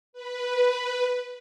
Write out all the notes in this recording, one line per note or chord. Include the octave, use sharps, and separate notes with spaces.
B4